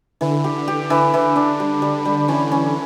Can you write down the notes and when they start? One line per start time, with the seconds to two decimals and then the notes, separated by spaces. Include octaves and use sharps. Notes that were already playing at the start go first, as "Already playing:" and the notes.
0.21 D3 E3
0.44 G4
0.68 G4
0.90 D3 E3
1.14 E3
1.36 D4
1.60 G3
1.82 G3
2.05 G3
2.28 E3 C#4
2.52 C#4